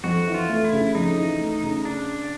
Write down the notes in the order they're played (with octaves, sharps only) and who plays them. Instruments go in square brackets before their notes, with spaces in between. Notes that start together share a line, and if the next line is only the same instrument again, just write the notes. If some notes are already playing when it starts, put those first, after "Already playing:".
[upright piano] F2 [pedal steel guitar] F#4
[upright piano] E3
[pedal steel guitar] F4
[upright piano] A3
[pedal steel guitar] E4
[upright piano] C#3
[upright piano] F2 [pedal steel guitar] D#4
[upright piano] E3
A3
C#3
[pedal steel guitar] D4